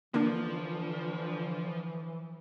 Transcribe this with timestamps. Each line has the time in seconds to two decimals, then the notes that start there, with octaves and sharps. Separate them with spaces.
0.14 D3 E3 F3 A#3 D4